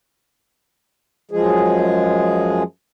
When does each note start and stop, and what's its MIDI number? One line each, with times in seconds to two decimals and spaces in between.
1.31 2.63 42
1.31 2.63 53
1.31 2.63 56
1.31 2.63 68